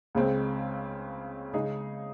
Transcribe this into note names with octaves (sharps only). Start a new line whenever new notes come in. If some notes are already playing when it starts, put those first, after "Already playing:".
C#2 C#3 G#3 C4
C#3 G#3 D#4 G#4